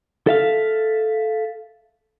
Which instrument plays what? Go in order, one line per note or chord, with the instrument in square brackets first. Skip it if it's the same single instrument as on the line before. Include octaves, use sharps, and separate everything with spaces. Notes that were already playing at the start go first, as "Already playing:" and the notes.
[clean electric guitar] A4 E5 F5